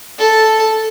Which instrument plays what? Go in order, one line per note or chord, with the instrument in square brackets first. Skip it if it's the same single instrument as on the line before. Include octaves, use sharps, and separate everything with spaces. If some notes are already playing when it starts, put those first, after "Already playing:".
[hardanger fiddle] A4